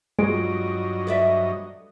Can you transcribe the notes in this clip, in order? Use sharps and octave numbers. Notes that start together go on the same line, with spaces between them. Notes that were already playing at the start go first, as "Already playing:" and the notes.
G2 F#3 G#3 F4 G4 D#5 D7
A4 B4 D5 E5